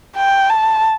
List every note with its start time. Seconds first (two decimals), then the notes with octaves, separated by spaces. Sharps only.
0.16 G5
0.50 A5